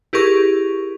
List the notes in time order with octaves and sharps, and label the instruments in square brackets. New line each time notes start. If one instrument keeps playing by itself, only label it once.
[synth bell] E4 G4 G#4 A#4 C#6